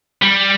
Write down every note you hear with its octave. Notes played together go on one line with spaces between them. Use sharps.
G3